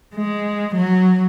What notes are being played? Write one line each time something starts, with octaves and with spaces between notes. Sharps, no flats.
G#3
F#3